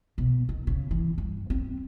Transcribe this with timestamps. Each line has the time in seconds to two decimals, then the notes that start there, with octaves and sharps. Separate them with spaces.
0.18 B2
0.49 D#3
0.67 C#3
0.91 E3
1.18 G2
1.50 C4